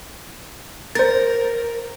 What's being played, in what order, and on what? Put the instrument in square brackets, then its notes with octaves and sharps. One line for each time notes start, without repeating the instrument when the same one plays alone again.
[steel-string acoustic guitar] A#4 [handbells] C5 A6